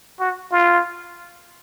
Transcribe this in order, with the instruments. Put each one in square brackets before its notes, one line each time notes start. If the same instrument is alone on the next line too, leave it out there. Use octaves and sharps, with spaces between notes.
[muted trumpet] F#4
F4